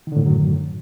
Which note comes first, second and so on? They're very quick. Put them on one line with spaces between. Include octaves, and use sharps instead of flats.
D#3 D3 A2 F#2 F#3